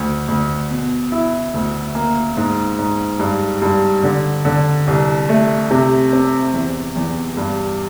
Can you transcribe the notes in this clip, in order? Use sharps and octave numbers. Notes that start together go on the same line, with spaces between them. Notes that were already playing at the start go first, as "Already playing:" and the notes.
Already playing: D2
D2
B2
E4
D2
A#3
G#2
G#2
G2
G2
D3
D3
C2
A3
C3
C4
E2
E2
G2